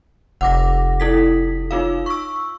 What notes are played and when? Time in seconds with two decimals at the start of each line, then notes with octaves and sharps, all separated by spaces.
0.41 F1 F#5 D6 A#6
1.00 E4 A4 B6
1.71 D#4 F4 F5
2.06 C#6 E6